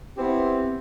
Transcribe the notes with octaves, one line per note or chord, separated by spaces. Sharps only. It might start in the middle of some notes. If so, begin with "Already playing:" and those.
B3 C4 E4 G4